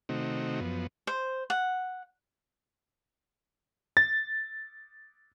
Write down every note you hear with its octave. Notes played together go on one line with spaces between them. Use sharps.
C3 D#3 A3 C4 D#4 F#4
F#2 F3 B3
C5
F#5
A6